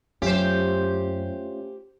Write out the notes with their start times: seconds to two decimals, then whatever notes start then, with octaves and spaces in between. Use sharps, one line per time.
0.22 F#2 A3 C#4 F4 G4 C5